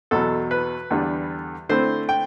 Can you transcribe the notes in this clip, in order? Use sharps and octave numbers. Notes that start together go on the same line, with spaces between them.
E2 B2 F#3 A4
B4
E2 D3 G3
D3 A3 C4 E4 C5
G5